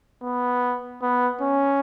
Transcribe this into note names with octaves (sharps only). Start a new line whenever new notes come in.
B3
B3
C#4